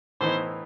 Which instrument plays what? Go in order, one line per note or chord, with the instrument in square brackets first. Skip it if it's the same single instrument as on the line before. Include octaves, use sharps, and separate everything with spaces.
[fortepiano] A2 E3 B3 D#4 [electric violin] C5